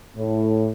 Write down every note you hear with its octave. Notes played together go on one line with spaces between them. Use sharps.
A2